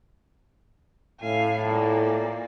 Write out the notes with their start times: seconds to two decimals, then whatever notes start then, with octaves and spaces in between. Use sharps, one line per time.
1.21 A2 E5 F5 G#5
1.64 A#2 A#3 D5